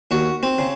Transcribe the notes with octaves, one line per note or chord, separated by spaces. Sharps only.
D#2 F#4
C4
C#3